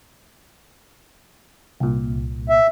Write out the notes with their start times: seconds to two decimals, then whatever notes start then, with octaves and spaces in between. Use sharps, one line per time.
1.80 C2 A#2
2.49 E5